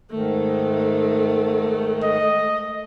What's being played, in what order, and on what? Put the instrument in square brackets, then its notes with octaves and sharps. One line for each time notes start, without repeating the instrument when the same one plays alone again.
[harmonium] G#2 D#3 [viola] A3
[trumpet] D#5